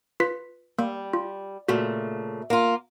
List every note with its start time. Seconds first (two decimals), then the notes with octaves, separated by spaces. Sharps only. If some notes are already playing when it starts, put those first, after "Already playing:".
0.20 F4 B4 B6
0.79 G3 A#3
1.13 F4
1.68 A#2 C#3 A3 F#4
2.50 A#3 F4